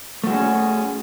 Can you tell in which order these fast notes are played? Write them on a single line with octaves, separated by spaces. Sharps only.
A3 F#4 G#4 C#4